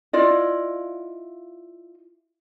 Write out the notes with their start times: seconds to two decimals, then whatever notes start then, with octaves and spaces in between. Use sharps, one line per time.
0.13 E4 F4 D5 D#5